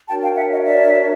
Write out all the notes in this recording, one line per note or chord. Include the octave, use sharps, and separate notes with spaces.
D4 F#4 A#4 C#5 G5 A5
F5 G5
E5 F#5
D#5 F5
D5 E5